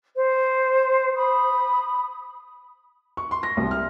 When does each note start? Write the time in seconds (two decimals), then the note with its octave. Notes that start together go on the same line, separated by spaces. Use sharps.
0.14 C5
1.15 B5 D#6
3.17 C#6
3.31 C6
3.43 A#6
3.57 C2
3.71 F6